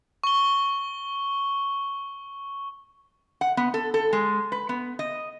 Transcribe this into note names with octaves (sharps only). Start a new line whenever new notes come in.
C#6 G7
F#5
B3
A4
A4
G#3
B4
B3
D#5